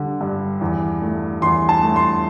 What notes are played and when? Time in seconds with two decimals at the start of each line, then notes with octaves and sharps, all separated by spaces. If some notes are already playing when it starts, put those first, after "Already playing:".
Already playing: D3 G3
0.21 G2
0.61 E2
1.02 A3
1.42 E2 C6
1.69 A5
1.83 A3
1.96 C6